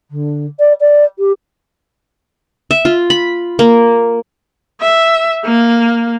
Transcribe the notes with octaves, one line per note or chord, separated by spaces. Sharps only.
D3
D5
D5
G4
E5
F4
B5
A#3
E5
A#3